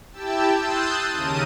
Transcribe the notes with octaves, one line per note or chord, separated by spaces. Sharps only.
E4 G4 G5 A5 E6
C6 D#6 E6 F#6 G6 A6
D#2 C#3 A#4 A5 D#6 D#7